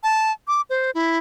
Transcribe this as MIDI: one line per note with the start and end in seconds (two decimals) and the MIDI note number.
0.03 0.32 81
0.48 0.61 86
0.70 0.91 72
0.95 1.18 64